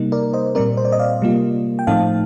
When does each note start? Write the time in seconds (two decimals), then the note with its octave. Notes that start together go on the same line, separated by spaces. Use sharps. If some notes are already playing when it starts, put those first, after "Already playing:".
Already playing: C3 G3 A#3 D#4
0.12 A#4 D5
0.33 C5 D#5
0.55 A#2 G3 C4 A#4 D5
0.77 C5
0.85 D5
0.92 D#5
0.99 D5 F5
1.21 C3 G3 A#3 F4
1.79 G5
1.87 A2 F3 A3 C4 D#4 F5 A5